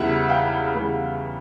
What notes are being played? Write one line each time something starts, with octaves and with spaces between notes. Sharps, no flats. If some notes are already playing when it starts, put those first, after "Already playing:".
Already playing: E2 C#3 E3 G3 E5 F#5
F5 G5
E2 C#3 E3 G3